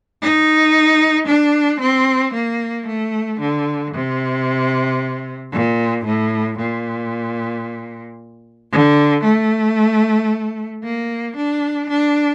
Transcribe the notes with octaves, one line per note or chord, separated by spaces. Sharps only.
D#4
D4
C4
A#3
A3
D3
C3
A#2
A2
A#2
D3
A3
A#3
D4
D4